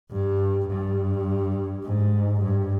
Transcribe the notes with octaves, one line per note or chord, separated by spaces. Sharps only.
G2
G2
G#2
G2